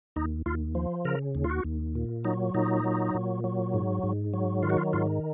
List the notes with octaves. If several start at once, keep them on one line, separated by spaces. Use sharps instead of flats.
D#2 D#4
D#2 F4
F3
C#3 A#4
D#2
F4
F#4
D#2
A#2
F#3 D#4
A#2 D#4
F#3
A#2
F#3
G#2
G#2
F#3
D#3 F4
F#4
F4
G#2 F4